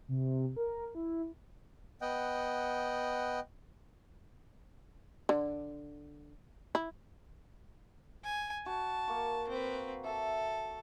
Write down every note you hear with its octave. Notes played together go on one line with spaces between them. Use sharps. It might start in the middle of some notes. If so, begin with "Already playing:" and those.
C3
A#4
E4
B3 D#5 F#5 G5
D3
E4
G#5
F#4 A5
A#3 C#6
C4 B4
A4 E5 A5